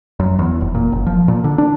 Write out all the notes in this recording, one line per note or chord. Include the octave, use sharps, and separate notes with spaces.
F#2
E2
F1
A#2
F#1
F3
A#2
D3
D4